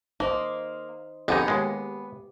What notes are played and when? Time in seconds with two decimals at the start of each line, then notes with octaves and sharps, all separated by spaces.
0.20 A#3 D#4 C5 D#5
1.28 F2 D3 B3 D#4 G4 G#4 B4
1.48 D#2 G#3